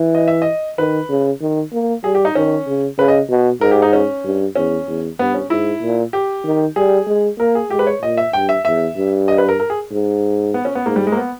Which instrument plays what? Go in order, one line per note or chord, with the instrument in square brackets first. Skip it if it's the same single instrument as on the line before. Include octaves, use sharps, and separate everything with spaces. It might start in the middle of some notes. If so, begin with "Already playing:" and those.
Already playing: [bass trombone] E3
[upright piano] D#5
E5
D#5
[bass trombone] D#3 [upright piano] B4
[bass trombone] C#3
D#3
A#3
[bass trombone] G3 [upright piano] G#4
[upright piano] G4
D#4
[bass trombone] D#3 [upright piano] C#4
[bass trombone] C#3
[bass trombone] C#3 [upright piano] B4
[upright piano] D#5
[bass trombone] B2
[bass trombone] G#2 [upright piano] A#4
[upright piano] G4
D#4
C#4
[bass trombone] G2
[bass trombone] E2 [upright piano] C#4
[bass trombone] E2
[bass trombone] G2 [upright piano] B3
[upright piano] C#4
[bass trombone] G#2 [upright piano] E4
[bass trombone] A#2
[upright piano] G4
[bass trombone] D#3
[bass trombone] G3 [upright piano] G#4
[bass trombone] G#3
[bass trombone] A#3 [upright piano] A#4
[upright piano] G#4
[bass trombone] G#3 [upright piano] G4
[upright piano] B4
C#5
[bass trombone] A#2 [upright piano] D#5
[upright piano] E5
[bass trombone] G2 [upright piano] G5
[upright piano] E5
[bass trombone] E2 [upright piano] E5
[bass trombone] G2
[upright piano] D#5
B4
A#4
A#4
G#4
[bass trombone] G#2
[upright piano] B3
C#4
B3
[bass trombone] G#2 [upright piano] A#3
[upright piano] G3
G#3
A#3
B3